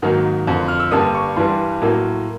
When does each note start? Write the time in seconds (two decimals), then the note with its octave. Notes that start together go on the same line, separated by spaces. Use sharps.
0.02 G#2 D#3 F#3 A#3
0.47 F2 D3 F3
0.68 F6
0.80 E6
0.91 G2 D3 G3 A#3 D#6
1.15 C#6
1.36 G2 E3 G3 C6
1.82 A2 F#3 A#3